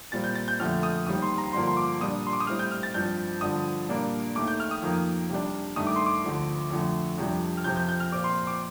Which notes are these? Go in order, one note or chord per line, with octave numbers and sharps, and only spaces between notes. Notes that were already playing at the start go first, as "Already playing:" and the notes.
A#2 G3 C4 A6
G6
A6
G6
F2 D3 A3 F6
D#6
D#2 D#3 G3 C4 D#6
C6
A#5
G2 D3 F3 A#3 C6
C6
D6
A#2 G3 D4 D#6
C6
D6
D#6
A2 G3 C4 F6
G6
F6
A6
G2 F3 C4 G6
G2 D3 F3 D#6
A#2 G3 A#3 D4
D#2 D#3 A3 D6
G6
F6
D#6
F2 D#3 A#3
C3 G3 D4
G2 D#3 A3 D#6
D6
C6
D6
D2 D3 F3
F2 D3 A3
F2 C3 G3 D4
F6
F2 C3 F3 G6
G6
G6
F6
A#2 F3 C4 D6
C6
D6